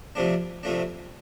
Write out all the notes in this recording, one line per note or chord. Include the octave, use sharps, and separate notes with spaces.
C3 F3 A3 D4
C3 F3 A3 D4